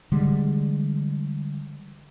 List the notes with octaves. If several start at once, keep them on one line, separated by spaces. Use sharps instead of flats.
D3 E3 G3 G#3